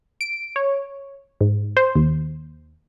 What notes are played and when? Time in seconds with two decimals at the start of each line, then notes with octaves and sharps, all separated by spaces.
0.21 D7
0.56 C#5
1.41 G#2
1.77 C5
1.95 D#2